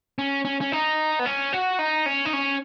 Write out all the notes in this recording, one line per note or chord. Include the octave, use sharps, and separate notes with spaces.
C#4
C#4
C#4
D#4
B3
C#4
F#4
D#4
C#4
D#4
C#4